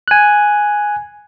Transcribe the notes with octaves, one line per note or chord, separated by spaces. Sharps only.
G#5 F#6